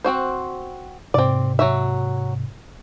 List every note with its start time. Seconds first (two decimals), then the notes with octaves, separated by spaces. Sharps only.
0.05 C4 F#4 C5
1.14 G#2 C3 C4 D5
1.59 F#3 F#4 E5